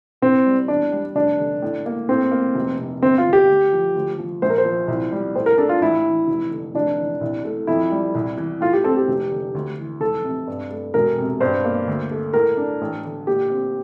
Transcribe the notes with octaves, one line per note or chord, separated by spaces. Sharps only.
C2 C4
G3
E2 D4
G3
F1 D4
D3
A2
A#3
A2 C4
A#3
F1
C3
G1 C4
F4
D3
G4
D2
F3
D2
F3
A#1 C5
A#4
C5
F3
C2
G3
A2 C5
A#4
D4 A4
F4
A1 E4
E3
F1
D3
F1 D4
E3
C2
A3
F2 E4
G3
C2
E3
A2 F4
G4
C4 A4
G4
F1
D3
D2
E3
F1 A4
C3
G2
A3
E1 A#4
C3
G2 C5
A#3
D2
A3
A2 A#4
D4
A1
D3
A#2 G4
C4